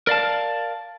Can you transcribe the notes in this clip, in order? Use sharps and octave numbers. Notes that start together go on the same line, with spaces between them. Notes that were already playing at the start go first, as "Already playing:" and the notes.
A#4 D5 F5 A5